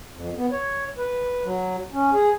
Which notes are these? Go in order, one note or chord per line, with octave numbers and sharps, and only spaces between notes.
F2
B3
C#5
B4
F#3
C#4
G#4